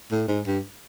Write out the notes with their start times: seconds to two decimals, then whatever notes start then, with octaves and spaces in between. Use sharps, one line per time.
0.11 A2
0.28 G#2
0.46 G2